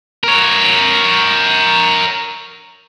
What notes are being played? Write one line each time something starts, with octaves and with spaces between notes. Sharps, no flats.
A#4 C#5